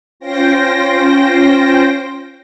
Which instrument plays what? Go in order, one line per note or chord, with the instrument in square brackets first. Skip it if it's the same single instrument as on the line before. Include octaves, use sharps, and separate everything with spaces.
[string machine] C#4 F4 C5 G5 A#6